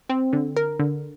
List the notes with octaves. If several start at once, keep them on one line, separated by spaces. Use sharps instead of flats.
C4
D3
A#4
D3